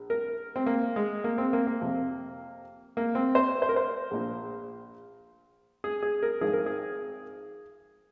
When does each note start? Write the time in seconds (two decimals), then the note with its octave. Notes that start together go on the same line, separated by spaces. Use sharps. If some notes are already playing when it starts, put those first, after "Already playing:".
Already playing: A#1
0.10 A#4
0.56 C4
0.66 A#3
0.96 G#3
1.24 A#3
1.38 C4
1.53 A#3
1.67 A#3
1.81 F2 C3 F3
2.97 A#3
3.15 C4
3.35 C5
3.62 C5
3.69 A#4
3.76 C5
4.11 A#1 A#2 F3
5.84 G#4
6.03 G#4
6.23 A#4
6.41 G#1 G#2 F3 G#4
6.53 A#4
6.66 G#4